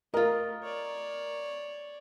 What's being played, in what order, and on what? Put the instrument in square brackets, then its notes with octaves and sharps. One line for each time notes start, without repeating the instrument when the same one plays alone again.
[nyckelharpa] A3 [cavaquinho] F4 D#5 [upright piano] A#4
[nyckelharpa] C#5 D5